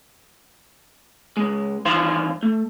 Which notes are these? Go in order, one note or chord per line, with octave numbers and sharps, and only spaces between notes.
C#2 G#3
G2 D#3 E3 C5 F5 C6
A3